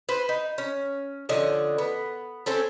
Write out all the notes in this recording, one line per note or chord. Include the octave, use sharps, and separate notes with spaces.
B4 C5
D#4
C#4
D3 F3 C#4 D#5
B3
C4 C#4 A4